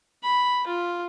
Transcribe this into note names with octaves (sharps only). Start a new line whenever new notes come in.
B5
F4